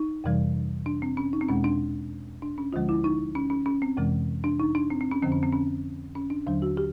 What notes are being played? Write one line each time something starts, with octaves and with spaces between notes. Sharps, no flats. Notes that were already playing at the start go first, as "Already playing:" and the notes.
Already playing: D#4
F2 C3 E3 G3
D4
C4
C#4
D#4
C4
E2 B2 G#3 C#4
D4
D4
C#4
D2 D3 F3 G#3 F4
E4
D#4
C#4
C#4
C#4
C4
F2 C3 E3 G#3
D4
D#4
D4
C4
C4
C#4
F2 D3 F3 C4
C#4
C4
C#4
C#4
D4
D#2 D3 F#3 D4
F#4
G4